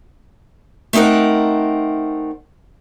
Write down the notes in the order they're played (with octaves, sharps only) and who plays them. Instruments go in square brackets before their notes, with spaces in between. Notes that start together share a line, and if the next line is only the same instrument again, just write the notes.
[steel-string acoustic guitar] A3 C4 D#4 A#4 F#5